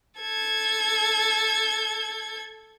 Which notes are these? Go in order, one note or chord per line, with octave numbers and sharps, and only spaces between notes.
A4 G#6